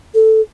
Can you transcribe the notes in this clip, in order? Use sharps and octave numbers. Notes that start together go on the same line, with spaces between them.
A4